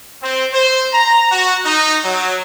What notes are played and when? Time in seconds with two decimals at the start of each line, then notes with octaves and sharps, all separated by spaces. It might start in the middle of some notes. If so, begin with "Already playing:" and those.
0.22 C4
0.53 C5
0.92 A#5
1.31 F#4
1.65 D#4
2.04 F#3